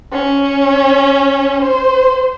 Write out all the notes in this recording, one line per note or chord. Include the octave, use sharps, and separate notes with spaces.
C#4
C5